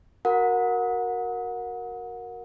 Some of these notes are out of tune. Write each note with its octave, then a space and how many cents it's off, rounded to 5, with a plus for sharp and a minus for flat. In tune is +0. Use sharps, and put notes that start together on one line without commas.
F#4 +0 A#4 +0 F#5 -25